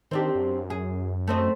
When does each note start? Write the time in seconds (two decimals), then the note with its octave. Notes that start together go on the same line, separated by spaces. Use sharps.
0.11 D#3 C4 D4 G4
0.35 F#2
0.70 G#4
1.27 A3 C4 D#5